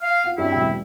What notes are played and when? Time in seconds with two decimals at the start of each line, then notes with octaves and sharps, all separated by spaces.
0.01 F5
0.24 F4 F#5
0.38 G2 C4 C#4 E4 F#4
0.52 E1 F#3 G5